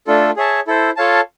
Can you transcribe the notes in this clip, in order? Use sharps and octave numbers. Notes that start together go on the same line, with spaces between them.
A3 D4 F4 A4
G#4 C#5 E5 A5
E4 A4 C5
F4 A4 C#5 F5 A5